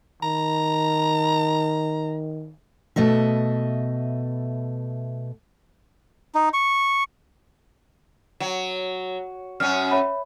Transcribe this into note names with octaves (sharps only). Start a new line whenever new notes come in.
D#3 A#5
B2 A3 D#5 E5
D#4
C#6
F#3
F#2 C#4 F6
C#5 E5 B5